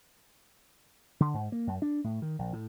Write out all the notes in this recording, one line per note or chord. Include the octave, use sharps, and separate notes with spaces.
D3
G#2
A#3
F#2
D4
A2
D#3
A#1
A2